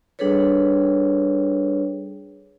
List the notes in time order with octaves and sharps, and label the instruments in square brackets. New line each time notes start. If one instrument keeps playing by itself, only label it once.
[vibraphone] G3 D4 G#4 A4 B4 C#5